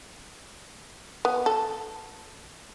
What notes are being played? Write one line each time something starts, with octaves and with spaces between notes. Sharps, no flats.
B3
A4